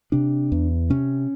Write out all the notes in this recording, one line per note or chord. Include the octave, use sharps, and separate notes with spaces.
C3 D4
E2
C3 C#4